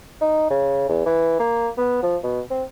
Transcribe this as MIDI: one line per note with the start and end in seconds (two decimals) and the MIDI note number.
0.21 0.50 63
0.50 0.88 49
0.89 1.01 40
1.06 1.36 52
1.39 1.68 58
1.77 2.02 59
2.03 2.16 53
2.24 2.40 47
2.50 2.63 60